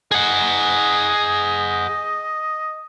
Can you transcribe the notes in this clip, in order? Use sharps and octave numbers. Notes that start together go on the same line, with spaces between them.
G#4 D#5 F#5